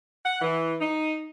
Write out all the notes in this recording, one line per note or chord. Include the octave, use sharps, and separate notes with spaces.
F#5
E3
D#4